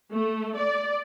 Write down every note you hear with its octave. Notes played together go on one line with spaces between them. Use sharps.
A3
D5